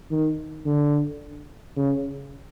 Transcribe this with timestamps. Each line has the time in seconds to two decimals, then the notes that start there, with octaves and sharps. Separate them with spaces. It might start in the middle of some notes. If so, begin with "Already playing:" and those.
0.11 D#3
0.66 D3
1.76 C#3